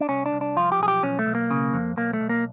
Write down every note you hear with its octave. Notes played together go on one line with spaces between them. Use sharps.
D4
C2 C#4
D4
C2
D4
F3 F4
G4
B1 G#4
G4
B1 C#4
A3
B1
A#3
C#3
F2
B1 A#3
A3
B1
A#3